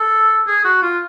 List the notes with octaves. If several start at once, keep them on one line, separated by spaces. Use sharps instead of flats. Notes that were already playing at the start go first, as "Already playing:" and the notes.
Already playing: A4
G#4
F#4
F4